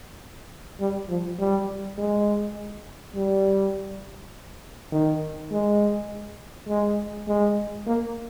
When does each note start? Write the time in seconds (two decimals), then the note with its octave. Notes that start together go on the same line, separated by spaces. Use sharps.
0.80 G3
1.09 F3
1.39 G3
1.98 G#3
3.15 G3
4.92 D#3
5.51 G#3
6.68 G#3
7.27 G#3
7.87 A#3